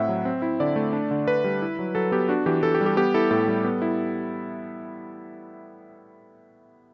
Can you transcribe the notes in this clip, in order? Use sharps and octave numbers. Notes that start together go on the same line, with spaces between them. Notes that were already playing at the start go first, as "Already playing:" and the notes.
Already playing: A2 C4 E4 E5 F#5
F#3
C4
E4
D3 D5
A3
D4
D3
D3 B4
G3
E4
F#3
F#3 A4
B3 G4
D4 F#4
E3 G4
E3 A4
G4
G3
G4
B3 G4
E4 A4
A2 A4
G3
B3
E4